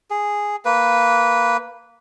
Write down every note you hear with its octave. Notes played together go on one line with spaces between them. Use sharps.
G#4
A#3 B4